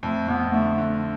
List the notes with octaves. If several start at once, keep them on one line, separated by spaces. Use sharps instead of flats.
F2 A3
F2 B3
D3 A3
D3